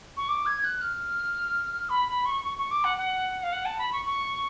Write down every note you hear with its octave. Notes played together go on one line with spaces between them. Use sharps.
C#6
D6
G#6
F#6
F6
B5
B5
C#6
C#6
C#6
D6
F#5
F#5
F5
F#5
A5
B5
C#6
C#6